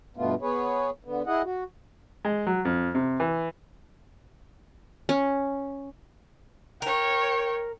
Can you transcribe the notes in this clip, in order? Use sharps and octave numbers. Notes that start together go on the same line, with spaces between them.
G2 B2 A3 B3 F4
B3 G#4 B4 C#5
D3 B3
E4 G#4 D#5 F#5
F#4
G#3
F#3
F2
C3
E3
C#4
A#4 C#5 G5